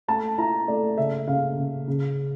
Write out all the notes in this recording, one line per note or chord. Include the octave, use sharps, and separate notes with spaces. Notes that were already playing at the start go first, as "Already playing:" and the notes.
A3 A5
E4 A#5
A3 D5
C#3 E5
C#3 F5
C#3
C#3